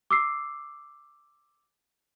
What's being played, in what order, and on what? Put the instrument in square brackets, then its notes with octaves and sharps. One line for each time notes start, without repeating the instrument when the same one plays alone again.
[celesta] D6 E6 C7